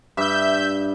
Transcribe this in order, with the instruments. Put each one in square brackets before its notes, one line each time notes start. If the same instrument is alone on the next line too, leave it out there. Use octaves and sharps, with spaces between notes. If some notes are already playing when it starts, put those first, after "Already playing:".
[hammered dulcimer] G2 [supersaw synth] E5 G6